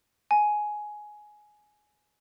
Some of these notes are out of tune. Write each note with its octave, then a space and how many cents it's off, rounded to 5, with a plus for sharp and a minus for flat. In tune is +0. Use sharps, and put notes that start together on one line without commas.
G#5 +15